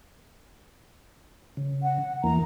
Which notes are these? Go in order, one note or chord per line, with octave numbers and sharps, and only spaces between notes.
C#3
F#5
E2 E3 A#3 A#5